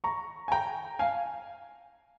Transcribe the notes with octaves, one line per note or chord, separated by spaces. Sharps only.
A#5 C#6
G#5
G5 A#5
F5 G#5